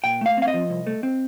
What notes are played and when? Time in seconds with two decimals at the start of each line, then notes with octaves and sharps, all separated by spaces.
0.04 A#2 G5
0.21 A3 F5
0.37 C4 F5
0.48 D#5
0.54 F3
0.70 C2
0.87 A3
1.03 C4